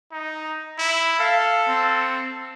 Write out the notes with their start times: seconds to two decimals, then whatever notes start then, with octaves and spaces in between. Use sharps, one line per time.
0.12 D#4
0.78 E4
1.20 A4 F5
1.69 C4